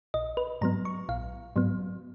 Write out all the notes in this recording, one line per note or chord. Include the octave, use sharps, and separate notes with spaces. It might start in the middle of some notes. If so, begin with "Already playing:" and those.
A#1 D#5
B4
G#2 F#3 B3 A#5
C#6
A#1 F5
G#2 F#3 B3